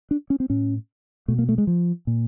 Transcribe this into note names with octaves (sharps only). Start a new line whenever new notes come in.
D4
C#4
C4
A2 C#4
B2 A3
A#3
A3
G#3
F3
A#2